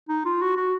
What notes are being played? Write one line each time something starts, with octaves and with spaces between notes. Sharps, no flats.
D#4
F4
F#4
F#4